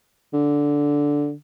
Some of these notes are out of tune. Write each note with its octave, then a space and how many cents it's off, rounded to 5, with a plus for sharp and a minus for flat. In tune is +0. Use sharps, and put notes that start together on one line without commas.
D3 -10